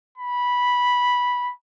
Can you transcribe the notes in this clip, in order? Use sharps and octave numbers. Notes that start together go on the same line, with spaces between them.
B5